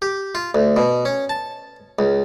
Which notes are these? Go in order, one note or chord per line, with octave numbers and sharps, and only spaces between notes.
G4
F4
D2
B2
C#4
A5
C#2